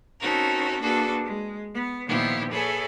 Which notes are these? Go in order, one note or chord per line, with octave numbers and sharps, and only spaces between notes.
C4 C#4 D#4 F#4 A4 A#4
A#3 D4 F#4 G#4 A4 B4
G#3
B3
A#2 D#3 F3 B3 E4 G4
G#4 A4 B4 C#5 E5 G#5